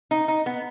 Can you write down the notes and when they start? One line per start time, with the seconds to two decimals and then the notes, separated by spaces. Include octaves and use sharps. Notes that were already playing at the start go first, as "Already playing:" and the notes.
0.11 D#4
0.28 D#4
0.46 B3